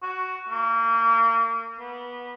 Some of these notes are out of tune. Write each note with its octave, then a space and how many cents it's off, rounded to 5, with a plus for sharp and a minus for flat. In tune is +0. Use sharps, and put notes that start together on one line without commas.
F#4 +10
A#3 -30
B3 -20